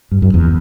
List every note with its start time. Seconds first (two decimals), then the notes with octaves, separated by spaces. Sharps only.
0.11 G2
0.22 F#2
0.34 E2